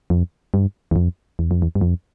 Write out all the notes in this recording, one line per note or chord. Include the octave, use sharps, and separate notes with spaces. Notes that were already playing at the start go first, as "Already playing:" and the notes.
F2
G2
E2
F2
E2
F2
E2
G2
F2